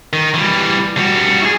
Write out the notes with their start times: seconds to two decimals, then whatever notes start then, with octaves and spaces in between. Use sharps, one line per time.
0.13 D#3
0.34 E3 G3
0.97 G3 F#4
1.42 E4 G#4